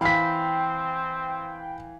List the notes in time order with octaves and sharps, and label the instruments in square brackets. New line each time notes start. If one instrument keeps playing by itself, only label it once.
[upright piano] E3 F5 [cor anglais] C4 [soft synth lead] G5 [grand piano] B5 B6